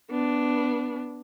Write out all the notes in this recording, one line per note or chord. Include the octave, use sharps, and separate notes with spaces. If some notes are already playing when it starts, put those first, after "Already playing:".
B3 D4